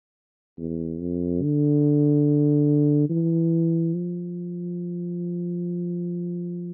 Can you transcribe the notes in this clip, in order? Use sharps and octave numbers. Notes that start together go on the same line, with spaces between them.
E2
F2
D3
E3
F3